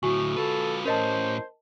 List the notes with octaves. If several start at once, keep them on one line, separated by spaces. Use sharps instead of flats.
D2 A2 F#4 G#5 C#6
F4 A4 B4
A2 C#4 A#4 C5 D#5 A5